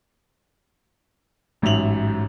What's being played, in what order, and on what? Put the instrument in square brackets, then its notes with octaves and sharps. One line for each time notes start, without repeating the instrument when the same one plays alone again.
[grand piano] A1 G#2 F#3 E5 F7 F#7